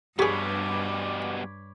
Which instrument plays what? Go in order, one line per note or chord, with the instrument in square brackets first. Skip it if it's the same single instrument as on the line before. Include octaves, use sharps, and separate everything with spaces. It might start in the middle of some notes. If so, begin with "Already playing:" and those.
[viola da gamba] G2 [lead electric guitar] B2 G3 [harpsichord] G4 G#4 [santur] C#5 B5 D6